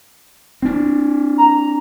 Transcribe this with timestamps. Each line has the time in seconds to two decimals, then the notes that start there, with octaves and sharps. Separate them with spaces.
0.62 C4 D4
1.38 A#5